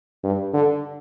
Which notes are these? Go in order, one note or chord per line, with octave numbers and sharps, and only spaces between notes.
G2
D3